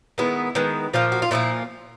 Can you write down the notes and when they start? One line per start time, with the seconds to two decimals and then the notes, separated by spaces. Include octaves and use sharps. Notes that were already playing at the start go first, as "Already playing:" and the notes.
0.18 D#3 G#3 B3 E4
0.55 D#3 G#3 B3
0.94 A#2 F3 A#3 F4
1.12 F#4
1.22 F4
1.31 A#2 F3 A#3 E4